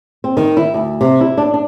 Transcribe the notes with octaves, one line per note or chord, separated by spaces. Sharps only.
C4
D#3
E4
D2
C3
E4
D4
D4